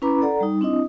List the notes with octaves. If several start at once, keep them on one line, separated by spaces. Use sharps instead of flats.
C#4 E4 B4 A#5 B5 D6
A4 D5 F#5 A#5
G3 D#4
C4 D4 E4 D#5 D#6